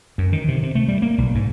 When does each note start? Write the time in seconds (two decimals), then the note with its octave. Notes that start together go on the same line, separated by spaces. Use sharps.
0.18 F#2
0.33 D#3
0.48 C3
0.63 C3
0.75 A3
0.88 G3
1.02 A#3
1.18 B1
1.35 G#2